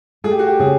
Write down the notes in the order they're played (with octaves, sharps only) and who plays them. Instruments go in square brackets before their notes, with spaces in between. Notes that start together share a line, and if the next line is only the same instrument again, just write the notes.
[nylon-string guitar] A3 [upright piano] G#4
[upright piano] G4
F#4
G4
[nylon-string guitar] C#3 [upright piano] G#4